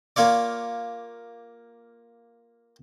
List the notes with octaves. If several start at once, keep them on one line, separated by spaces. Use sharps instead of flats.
A#3 F4 C#5 D5